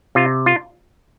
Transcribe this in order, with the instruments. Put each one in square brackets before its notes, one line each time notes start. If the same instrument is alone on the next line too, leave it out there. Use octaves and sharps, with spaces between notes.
[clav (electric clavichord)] C3 F4
F4